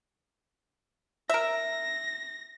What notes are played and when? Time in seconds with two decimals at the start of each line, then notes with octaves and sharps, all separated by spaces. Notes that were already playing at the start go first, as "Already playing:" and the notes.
1.29 A#4 E5 A#6